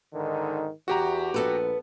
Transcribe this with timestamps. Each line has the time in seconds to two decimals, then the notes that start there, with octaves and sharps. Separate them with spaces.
0.13 G#2 D3 D#3
0.88 E2 F#4 G4 A#5
1.34 A#1 B3 A4 B4